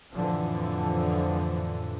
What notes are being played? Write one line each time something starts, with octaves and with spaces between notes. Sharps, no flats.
F2 A2 D3 E3 F3